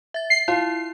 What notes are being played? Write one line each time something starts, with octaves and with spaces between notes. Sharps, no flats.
E5 A6
C7
E4 F4